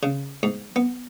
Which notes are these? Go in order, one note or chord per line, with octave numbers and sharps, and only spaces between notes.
C#3
G#2
B3